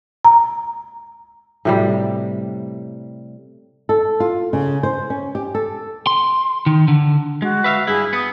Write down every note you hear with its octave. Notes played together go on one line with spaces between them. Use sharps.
A#5
A2 C3 G3
A4
F4
C#3
C5
C#4
G4
A4
C6
D#3
D3
G#3 F#4
B4 E5 F5
G2 E4 G#4
B3 D#6